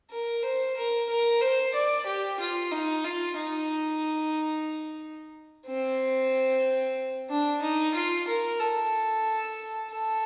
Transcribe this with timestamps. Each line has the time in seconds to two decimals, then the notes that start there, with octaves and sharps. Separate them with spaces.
0.11 A#4
0.43 C5
0.77 A#4
1.09 A#4
1.41 C5
1.74 D5
2.06 G4
2.40 F4
2.72 D#4
3.04 F4
3.37 D#4
5.66 C4
7.29 D4
7.61 D#4
7.94 F4
8.28 A#4
8.60 A4
9.91 A4